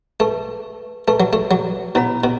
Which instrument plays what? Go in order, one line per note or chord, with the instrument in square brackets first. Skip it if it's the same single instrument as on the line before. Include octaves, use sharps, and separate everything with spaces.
[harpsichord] A3 [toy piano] B4 A5 C#6
[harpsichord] A3 [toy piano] B4 A5 C#6
[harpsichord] F#3
A3
F#3
[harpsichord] B2 [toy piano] E4 C#5 F#5 B5
[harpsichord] B2